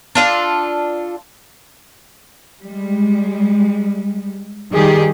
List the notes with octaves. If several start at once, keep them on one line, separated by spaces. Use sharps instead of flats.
D4 F4 A4
G3 G#3
D#3 G3 G4 G#4